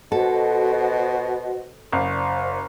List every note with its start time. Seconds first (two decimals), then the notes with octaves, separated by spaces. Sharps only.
0.12 B2 F#4 A4 C5 D#5
1.92 F#1 C5 D5